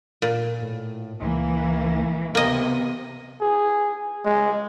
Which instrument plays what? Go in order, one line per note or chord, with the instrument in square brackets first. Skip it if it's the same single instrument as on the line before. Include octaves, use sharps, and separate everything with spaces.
[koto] A#2
[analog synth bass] A2
[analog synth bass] C#2 [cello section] E3 A#3
[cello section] C3 [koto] A#3 D#5 [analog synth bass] B3
[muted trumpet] G#4
G#3